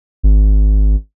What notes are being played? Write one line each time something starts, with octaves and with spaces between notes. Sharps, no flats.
G#1